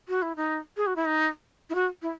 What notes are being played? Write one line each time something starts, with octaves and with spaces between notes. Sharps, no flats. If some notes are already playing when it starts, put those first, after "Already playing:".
F#4
E4
D#4
G#4
F#4
E4
D#4
E4
F#4
E4